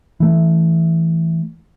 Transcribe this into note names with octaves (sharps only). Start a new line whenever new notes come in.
E3 A3